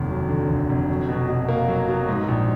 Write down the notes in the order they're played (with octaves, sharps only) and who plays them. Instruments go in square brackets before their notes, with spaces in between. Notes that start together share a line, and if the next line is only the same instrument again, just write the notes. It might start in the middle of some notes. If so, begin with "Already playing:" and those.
Already playing: [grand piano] F1 D#2
F#3
D3
D#2
F1
F#3
B2
B2
A#3
F#3
B2
G#2
A#1